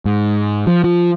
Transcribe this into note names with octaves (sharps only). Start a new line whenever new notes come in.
G#2
F3
F3